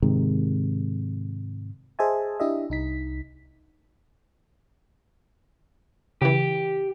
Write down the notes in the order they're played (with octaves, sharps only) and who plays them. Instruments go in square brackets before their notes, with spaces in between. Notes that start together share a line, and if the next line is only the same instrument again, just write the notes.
[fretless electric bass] G#2 C3 D#3 G#3
[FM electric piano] G#4 C5 D#5 E5 G#5 A5
D4 E4 G4 D#5 E5
C2 D#4 B6
[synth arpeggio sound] C#3 E3 [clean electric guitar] G4